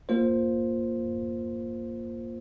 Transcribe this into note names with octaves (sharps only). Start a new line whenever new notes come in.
A#3 F4 C5